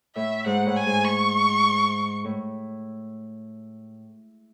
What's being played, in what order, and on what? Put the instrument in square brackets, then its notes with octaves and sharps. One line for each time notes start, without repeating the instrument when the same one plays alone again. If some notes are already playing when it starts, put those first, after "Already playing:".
[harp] A2 [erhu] E5
[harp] G#2 [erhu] F#5
[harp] A2
[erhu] G#5
[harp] G#2
[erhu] C#6
[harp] A2